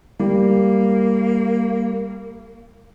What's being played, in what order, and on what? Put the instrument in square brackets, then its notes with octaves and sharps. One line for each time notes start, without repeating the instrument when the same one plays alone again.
[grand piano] G3 [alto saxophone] A#3